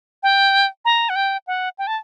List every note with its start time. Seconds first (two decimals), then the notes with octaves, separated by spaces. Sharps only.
0.23 G5
0.85 A#5
1.09 F#5
1.16 G5
1.47 F#5
1.78 G5
1.87 A5